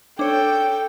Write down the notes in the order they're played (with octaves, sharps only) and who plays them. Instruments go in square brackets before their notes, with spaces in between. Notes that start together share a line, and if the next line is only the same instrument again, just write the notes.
[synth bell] D4 C#5 [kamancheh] A4 G5